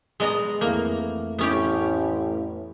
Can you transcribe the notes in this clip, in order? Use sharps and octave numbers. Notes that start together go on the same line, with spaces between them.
G#3 B3 G#4 D5 D#5 A#5
F2 E3 A3 A#3
A1 B3 C#4 G4